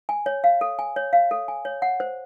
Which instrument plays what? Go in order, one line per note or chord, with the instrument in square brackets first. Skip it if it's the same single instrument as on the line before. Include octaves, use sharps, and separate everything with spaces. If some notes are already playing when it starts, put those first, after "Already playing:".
[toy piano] G#5
C#5
F5
A4
G#5
C#5
F5
A4
G#5
C#5
F#5
C5